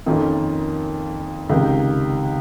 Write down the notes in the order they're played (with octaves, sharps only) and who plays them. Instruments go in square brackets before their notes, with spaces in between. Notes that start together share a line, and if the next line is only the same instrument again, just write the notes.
[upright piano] F2 D#3 A#3 C#4 F4
C#2 C3 D#3